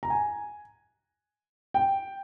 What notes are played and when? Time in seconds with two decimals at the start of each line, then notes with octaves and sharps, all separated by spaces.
0.03 A#5
0.10 G#5
1.74 G5